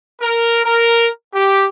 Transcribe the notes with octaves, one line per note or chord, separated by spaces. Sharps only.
A#4
A#4
G4